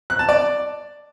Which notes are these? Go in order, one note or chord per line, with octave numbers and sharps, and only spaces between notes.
F#6
A5
D5